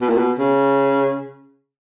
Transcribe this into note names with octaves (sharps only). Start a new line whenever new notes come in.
B2
A#2
B2
C#3